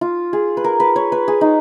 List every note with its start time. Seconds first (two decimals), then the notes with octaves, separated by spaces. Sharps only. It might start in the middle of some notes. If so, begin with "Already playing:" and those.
0.01 F4
0.33 G#4
0.57 B4
0.64 A#4
0.80 B4
0.96 C#5
1.12 B4
1.28 G#4
1.41 D#4